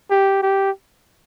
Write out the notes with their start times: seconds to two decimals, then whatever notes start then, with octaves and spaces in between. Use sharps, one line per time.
0.11 G4
0.42 G4